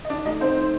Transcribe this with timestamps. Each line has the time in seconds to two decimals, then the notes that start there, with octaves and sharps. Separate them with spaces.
0.05 D#5
0.10 D#3 D4 D5
0.25 A3 D#4 D#5
0.41 D#3 C4 C5
0.56 D#4